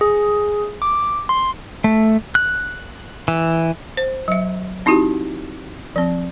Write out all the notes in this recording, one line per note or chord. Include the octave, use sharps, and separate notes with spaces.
G#4
D6
C6
A3
F#6
E3
C5
F#3 E5
C4 D#4 E4 F#4 G4
F3 C4